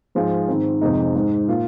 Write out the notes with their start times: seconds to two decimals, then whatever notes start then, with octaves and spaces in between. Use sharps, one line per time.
0.15 G#2 F3 G#3
0.48 G#2 D#3 C4
0.81 F2 C3 G#3 D#4
1.15 G#2 G#3 D#4
1.48 A#2 A#3 F4